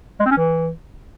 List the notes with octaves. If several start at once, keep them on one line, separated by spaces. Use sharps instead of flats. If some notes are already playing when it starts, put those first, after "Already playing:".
G#3
C4
C#4
E3